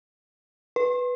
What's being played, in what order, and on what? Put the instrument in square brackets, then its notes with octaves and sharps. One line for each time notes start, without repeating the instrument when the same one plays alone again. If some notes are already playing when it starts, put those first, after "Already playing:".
[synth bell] B4